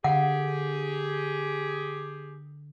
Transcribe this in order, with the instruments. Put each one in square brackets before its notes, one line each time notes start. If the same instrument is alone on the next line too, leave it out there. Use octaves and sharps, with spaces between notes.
[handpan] D3 [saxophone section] G4 G#4 [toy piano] F5 F#5